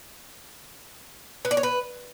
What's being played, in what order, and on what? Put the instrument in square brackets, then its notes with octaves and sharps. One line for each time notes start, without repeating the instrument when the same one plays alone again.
[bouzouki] B3
D5
C#5
B4